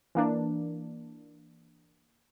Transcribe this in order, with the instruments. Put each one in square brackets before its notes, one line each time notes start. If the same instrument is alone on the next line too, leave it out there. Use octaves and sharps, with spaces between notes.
[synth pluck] E3 A#3 D4